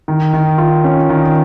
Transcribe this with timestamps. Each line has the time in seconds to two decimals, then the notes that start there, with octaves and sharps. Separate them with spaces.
0.08 D#3
0.34 D#3
0.58 F4
0.84 C#4
1.09 D#3